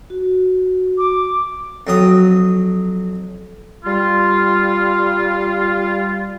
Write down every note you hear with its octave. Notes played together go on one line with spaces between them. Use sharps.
F#4
D6
F2 F#3 D#6
G3 F4